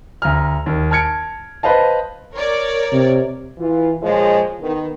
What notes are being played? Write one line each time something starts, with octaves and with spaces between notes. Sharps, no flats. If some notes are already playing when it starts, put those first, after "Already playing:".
D2 A#5 F6
D#2
A5 F6 G#6 C#7 D7
B4 C5 D#5 F5 A5
A#4 C#5 D5
C3
E3 F4
A#2 F3 G#3 G#4 C#5 D#5
D#3 B3